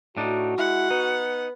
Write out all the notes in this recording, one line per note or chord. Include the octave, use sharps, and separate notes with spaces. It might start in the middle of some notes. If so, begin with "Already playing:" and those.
A2 D4 D#4 F#4
G#3 E4 F#5
B3 D#4